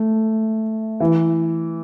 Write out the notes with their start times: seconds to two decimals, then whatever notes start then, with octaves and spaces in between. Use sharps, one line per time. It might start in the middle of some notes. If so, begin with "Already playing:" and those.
Already playing: A3
1.00 E3